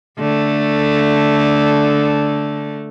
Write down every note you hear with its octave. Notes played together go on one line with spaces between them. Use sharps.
D3 A3